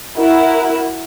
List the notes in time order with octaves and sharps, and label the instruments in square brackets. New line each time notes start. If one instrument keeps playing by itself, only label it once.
[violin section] E4 F#4 A#4